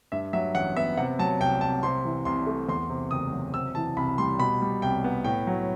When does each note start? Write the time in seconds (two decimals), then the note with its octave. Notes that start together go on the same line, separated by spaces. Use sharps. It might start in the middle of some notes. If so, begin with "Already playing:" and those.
0.12 G2 E5
0.33 F#3 E5
0.55 A1 F#5
0.76 B3 E5
0.97 C3 F#5
1.19 F#3 A5
1.40 C2 G5
1.61 C2 A5
1.83 C3 C6
2.05 E3
2.25 C2 C6
2.47 A3
2.69 E2 C6
2.90 C3
3.11 F#1 D#6
3.32 F#3
3.54 C3 E6
3.75 E3 A5
3.97 C2 B5
4.18 G3 C6
4.39 B2 B5
4.62 G3
4.82 C2 G5
5.04 B3
5.24 A2 G5
5.47 F#3